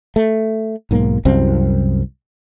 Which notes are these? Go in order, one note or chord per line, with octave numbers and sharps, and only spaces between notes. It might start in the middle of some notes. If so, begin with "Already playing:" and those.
A3
B1 G#2 A#3
C2 F#2 C4